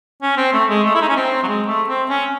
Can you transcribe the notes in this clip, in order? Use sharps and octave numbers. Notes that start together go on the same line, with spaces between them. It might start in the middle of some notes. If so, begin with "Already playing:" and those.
C#4
C4
A3
G#3
A3
E4
D#4
C#4
C4
F#3
G#3
A3
C4
C#4